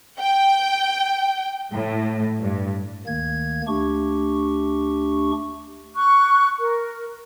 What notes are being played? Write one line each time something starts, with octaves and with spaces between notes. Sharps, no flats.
G5
A2
G2
D2 D#3 A#3 G#6
D2 A3 D4 G4 C#6
C#6 F#6
A#4